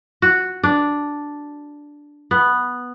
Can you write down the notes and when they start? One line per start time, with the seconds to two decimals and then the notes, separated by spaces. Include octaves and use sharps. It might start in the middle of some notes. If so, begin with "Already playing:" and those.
0.22 F#4
0.63 D4
2.31 B3